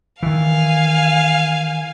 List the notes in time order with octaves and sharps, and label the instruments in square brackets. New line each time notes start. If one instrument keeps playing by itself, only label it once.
[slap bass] D#3 E3 [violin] F5 G#5